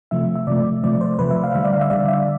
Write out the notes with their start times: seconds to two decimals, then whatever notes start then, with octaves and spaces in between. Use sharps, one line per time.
0.11 C3 F3 A3 E5
0.35 E5
0.47 C3 F3 A3 D5
0.83 C3 F3 A3 D5
0.95 D5
1.01 C5
1.19 C3 F3 A3 B4
1.30 E5
1.43 F5
1.54 D3 G3 E5
1.64 D5
1.73 F5
1.81 E5
1.90 D3 G3 D5
2.08 E5